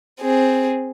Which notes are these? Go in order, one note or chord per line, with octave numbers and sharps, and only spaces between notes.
C4 G#4